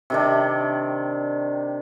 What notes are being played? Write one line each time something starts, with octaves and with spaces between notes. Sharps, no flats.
C3 D#3 D4